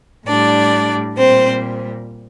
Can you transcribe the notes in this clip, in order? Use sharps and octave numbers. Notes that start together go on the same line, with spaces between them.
A2 G3 D4 D5
A#2 G3 C4 C5